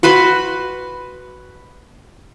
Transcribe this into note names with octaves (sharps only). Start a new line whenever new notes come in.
F#4 B4 B5 C6